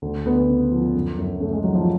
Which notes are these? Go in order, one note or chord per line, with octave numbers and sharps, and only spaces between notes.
D2
D2 B3
C#3
F3
F#2
F#2
C#3 A3
G#3
F3 F#3
F3